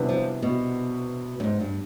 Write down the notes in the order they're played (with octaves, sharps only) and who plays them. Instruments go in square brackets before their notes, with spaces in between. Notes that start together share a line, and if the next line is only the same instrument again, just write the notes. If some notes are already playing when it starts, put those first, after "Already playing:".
Already playing: [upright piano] C3 E3 G3 B3 D4
[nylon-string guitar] F3
B2
G2
G#2
G2